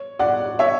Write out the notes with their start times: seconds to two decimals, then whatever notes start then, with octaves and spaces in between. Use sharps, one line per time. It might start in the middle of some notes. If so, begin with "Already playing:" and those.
Already playing: C#5
0.19 D5 F#5
0.59 C#5 E5